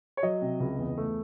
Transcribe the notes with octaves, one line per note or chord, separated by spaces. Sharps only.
C#5
F#3 D#5
C3
C#2
E2
A3